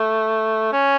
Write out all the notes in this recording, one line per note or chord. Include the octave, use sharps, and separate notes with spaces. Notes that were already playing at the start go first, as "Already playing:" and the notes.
Already playing: A3
C#4